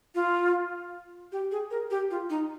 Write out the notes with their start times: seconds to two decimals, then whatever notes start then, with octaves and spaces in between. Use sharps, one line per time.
0.15 F4
1.32 G4
1.52 G#4
1.71 A#4
1.91 G4
2.11 F4
2.30 D#4